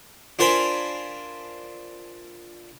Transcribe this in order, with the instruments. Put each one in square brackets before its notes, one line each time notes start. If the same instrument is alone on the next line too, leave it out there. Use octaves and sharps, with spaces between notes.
[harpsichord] D4 F4 A#4 C5 G#5 B5